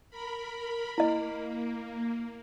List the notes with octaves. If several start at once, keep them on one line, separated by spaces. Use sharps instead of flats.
A#4 B5
A#3 E4 D#5